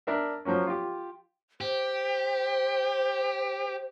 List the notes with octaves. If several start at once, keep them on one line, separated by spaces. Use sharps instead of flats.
D4 A#4 E5
F3 F#3 A#3 C#4
F4 G4
G4 C5